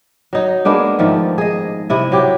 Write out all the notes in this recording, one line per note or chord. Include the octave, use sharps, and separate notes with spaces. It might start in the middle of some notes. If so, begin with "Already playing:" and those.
F#3 D#4
G#3 A#3 B3 D4
G#2 D#3 F3 A3
G#4 D#5
C3 E4 D#5
F#3 G4 G5